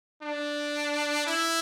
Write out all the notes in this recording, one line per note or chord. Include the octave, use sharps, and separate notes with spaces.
D4
E4